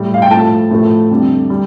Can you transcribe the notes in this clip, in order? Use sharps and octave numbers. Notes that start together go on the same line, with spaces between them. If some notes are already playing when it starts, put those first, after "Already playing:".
Already playing: A2 G3
F5
G5
A2 F3 A3 A5
A2 F3 A3
F2 D3 G3
G3